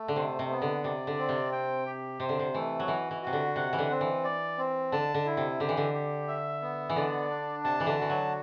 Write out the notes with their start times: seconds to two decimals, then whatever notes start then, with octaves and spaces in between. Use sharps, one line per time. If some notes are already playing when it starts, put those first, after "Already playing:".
Already playing: A3
0.08 D3
0.16 C3 C5
0.39 C3
0.50 B3
0.62 D3
0.84 C3 D5
1.07 D3
1.18 C4
1.29 C3
1.52 G5
1.86 G4
2.20 C3 C5
2.29 D3
2.39 C3
2.54 E3 A3
2.80 F#3
2.88 E3 F#4
3.11 E3
3.22 C3 F#4
3.33 D3
3.56 C3 F#5
3.73 E3
3.79 D3
3.90 C4
4.01 E3
4.24 D5
4.58 C4
4.92 D3 A5
5.14 D3
5.26 E4
5.37 C3
5.60 D3 G4
5.69 E3
5.77 D3
5.94 G4
6.28 E5
6.62 B3
6.90 E3
6.96 D3 D5
7.30 D4
7.64 C3 A5
7.80 E3
7.86 D3
7.98 E3 F#4
8.10 F#3